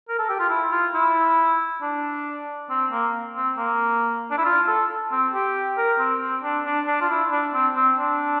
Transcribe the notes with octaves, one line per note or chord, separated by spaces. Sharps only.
A#4
A4
G4
F4
E4
F4
E4
D4
C4
A#3
C4
A#3
D4
E4
F4
A4
C4
G4
A#4
C4
C4
D4
D4
D4
F4
E4
D4
C4
C4
D4